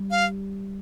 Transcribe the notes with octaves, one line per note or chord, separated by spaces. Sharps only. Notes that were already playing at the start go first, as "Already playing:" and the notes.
Already playing: G3
F5